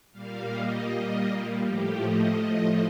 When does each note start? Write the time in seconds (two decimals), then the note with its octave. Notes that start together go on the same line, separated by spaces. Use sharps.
0.12 A#2 G3 A#3 F5
0.49 D#5
1.63 A2 F3 A3 G4
2.01 D#5
2.39 D#5